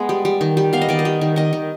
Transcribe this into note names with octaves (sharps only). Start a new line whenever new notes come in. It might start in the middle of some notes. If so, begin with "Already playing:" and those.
Already playing: G#3 B3
G3
G3
D#3
G3
B3 F5
D#5
D#3 D5
D#5
G3
D#3
D#3 D#5
D#3